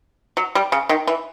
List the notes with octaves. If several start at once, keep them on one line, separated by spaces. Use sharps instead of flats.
F#3
G3
C#3
D#3
E3